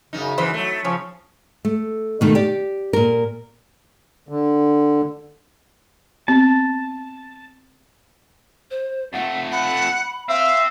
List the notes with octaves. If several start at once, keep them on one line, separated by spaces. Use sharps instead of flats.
F#2 C#3 D#4
F#2 E3 C5 D#5 B5
F#3 A3
C#3 F3 G#4 C#5
A3
B2 D#3 A3
G4 D5
A#2 A#4
D3
B3 C4 A5
C5
F2 A3 F#5
F#5 B5
C4 E5 F5